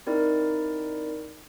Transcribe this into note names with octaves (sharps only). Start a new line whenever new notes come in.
C4 D#4 E4 A#4 D5